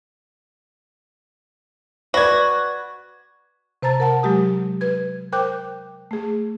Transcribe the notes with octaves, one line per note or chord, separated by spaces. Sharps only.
F#4 B4 D5 G#6
C3 C5 A5 A#5 A6
A#4 F#5 A5
F#3 G#3 G4 D#6
B4 G#6
A#4 C5 G5 D6 F#6 G6
A3 G#4